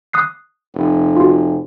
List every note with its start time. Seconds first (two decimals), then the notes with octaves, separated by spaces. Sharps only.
0.13 D#6 F#6 C7
0.74 F1
1.17 F4 F#4